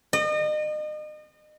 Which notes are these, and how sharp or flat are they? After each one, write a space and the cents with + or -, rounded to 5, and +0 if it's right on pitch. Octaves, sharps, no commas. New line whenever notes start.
D#5 -35